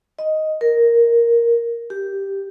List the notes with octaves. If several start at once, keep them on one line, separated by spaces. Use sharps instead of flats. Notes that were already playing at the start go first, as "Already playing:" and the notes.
D#5
A#4
G4